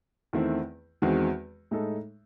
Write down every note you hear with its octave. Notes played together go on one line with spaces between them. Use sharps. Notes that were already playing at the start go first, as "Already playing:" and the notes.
E2 D#3 A3 C4 E4
E2 D#3 G#3 C4 F#4
A2 G#3 D#4 A4